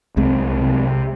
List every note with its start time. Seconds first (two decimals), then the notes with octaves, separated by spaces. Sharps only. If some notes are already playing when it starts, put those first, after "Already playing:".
0.17 C2 G#3 C4
0.61 C3